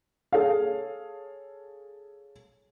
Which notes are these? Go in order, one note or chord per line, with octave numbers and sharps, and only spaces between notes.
G#4 A4 C#5 F5